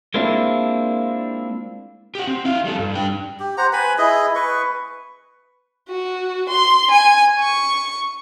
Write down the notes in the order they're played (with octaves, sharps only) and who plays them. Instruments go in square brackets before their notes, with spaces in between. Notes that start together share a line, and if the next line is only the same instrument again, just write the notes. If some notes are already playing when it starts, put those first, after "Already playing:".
[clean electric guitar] G#3 A#3 C4 D4 E4 F4
[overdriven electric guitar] G4 F#5
C4
E4 F5
G3 A4
G2
D4 G5
[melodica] G4
C5 F#5 A#5
B4 G#5 B5
E4 G#4 D#5
B4 C#6
[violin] F#4
C6
G#5
C#6